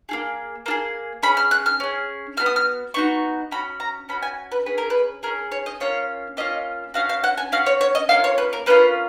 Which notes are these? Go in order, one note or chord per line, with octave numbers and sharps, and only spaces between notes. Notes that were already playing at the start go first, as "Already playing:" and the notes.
A#3 F4 G#4
A#3 F4 G#4
C#4 G#4 B5
F6
F#6
F6
C#4 G#4
B3 D#4 F#4 F6
D#6
F6
B3 D#4 F#4 C#6
C#4 F#4 B5
A#5
C#4 F#4 B5
G#5
B4
C#4 G#4 B4
A#4
B4
C#4 G#4 A#4
C#5
D#5
A#3 C#4 F4 C#5
A#3 C#4 F4 D#5
C#4 F#4 F5
F5
F#5
G#5
C#4 F#4 F5
C#5
C#5
D#5
A#3 C#4 F4 F5
C#5
B4
A#4
A#3 C#4 F4 B4